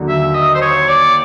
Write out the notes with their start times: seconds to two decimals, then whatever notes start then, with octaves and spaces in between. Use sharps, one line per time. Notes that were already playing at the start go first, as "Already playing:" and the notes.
Already playing: D#2 D3 F#3
0.09 E5
0.35 D#5
0.55 C5
0.62 C#5
0.89 D5